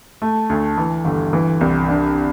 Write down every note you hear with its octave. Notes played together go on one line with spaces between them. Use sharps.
A3
D2
E3
G1
E3
C2
D4